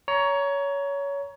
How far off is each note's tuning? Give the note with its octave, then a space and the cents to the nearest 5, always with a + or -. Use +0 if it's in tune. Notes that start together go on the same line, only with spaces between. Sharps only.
C#5 +20 A#5 +10